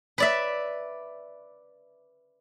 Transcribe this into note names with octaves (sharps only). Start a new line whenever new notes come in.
B4 D5 E5